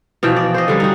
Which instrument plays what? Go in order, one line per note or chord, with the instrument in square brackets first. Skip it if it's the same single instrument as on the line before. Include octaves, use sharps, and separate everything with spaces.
[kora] B2 E3 F3 G5
D5
C5 D#5
D3 G3 C#4
D#4 F#4